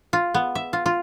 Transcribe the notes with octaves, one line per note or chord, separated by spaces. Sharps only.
F4
B3
E5
F4
F4